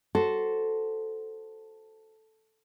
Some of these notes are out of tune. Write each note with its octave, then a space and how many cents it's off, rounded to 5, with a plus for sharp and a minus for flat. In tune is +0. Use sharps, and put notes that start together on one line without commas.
F#4 +10 A4 +0 C5 +0